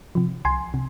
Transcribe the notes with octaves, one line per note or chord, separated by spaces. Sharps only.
C3 F3
C2 G#5 C6
C3